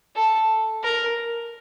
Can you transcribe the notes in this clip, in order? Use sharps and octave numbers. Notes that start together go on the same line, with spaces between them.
A4
A#4